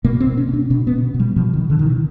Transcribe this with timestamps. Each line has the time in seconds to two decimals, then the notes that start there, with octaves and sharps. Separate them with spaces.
0.04 B2 A#3
0.20 C4
0.26 B2
0.38 C#4
0.49 B2 D4
0.70 B2 C#4
0.87 B3
0.92 B2
1.14 B2
1.20 G3
1.36 B2 F3
1.53 D#3
1.58 B2
1.70 D3
1.79 B2 D#3
1.86 E3